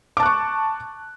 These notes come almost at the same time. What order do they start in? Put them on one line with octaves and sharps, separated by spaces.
D6 A5 F#6 C#6